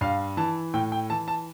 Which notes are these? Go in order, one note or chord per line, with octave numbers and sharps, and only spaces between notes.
G2 F5
E3 A5
A2 G5
G5
E3 A5
A5